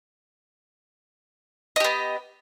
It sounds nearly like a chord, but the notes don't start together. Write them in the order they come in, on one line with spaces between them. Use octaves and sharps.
D#5 G4 B3